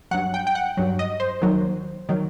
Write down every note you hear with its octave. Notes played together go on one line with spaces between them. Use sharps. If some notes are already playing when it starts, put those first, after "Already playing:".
G2 F#3 F#5
G5
G5
F#5
G2 F#3
D#5
C5
D#2 D#3 F#3
D#3 F#3